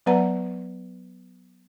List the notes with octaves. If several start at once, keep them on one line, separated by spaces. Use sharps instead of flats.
F#3 B3 B4 D5 F#5 A#5